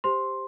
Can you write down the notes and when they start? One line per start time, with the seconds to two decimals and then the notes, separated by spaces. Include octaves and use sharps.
0.04 G4 C5 C6